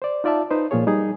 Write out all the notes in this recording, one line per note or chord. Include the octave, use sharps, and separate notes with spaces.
C5 D5
D#4 F4 D5 E5 A5
D#4 B4 C5
A#2 F3 F4 G#4 C#5
G3 D#4 G#4